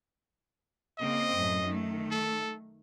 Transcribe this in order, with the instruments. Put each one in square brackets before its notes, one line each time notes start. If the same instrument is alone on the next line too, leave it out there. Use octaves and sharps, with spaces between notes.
[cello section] C#3 A#3 C4 [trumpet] D#5
[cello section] F#2 A2
D#3 A3
[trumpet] A4